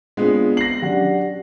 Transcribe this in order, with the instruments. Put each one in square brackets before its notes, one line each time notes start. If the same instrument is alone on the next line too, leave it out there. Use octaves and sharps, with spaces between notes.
[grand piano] G#3 B3 C4 [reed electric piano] D4 F4 G#4
[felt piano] A#6 C7 [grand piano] F#7
[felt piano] F#3 C#4 D4 [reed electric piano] G4 F#5